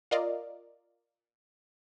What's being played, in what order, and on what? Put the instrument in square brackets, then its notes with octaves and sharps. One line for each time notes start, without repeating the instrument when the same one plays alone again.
[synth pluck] F4 A#4 D5 D#5 F5